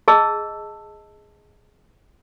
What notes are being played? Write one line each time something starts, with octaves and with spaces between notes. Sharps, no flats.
G#4 D#5 A5 E6